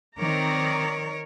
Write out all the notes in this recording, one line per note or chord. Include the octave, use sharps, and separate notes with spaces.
D#3 C4 A#4 C#5 D5 A#5